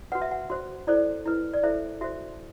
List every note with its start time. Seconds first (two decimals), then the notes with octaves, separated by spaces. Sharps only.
0.12 F#4 B4 F#5
0.22 E5
0.31 F#5
0.50 F#4 C5
0.87 E4 A4 C5 D5
1.26 E4 B4
1.54 D5
1.63 E4 A4 C5 E5
2.01 F#4 C5 E5